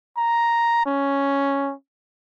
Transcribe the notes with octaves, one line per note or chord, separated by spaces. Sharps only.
A#5
C#4